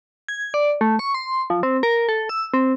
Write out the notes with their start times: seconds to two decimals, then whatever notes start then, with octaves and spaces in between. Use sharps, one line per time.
0.28 G#6
0.54 D5
0.81 A3
0.99 C#6
1.15 C6
1.50 F3
1.63 C4
1.83 A#4
2.09 A4
2.29 E6
2.54 C4